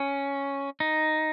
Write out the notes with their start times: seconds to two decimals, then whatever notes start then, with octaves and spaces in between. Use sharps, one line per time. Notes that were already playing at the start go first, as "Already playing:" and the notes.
Already playing: C#4
0.80 D#4